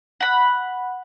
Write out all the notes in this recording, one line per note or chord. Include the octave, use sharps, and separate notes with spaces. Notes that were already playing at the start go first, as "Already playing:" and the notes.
F#5 B5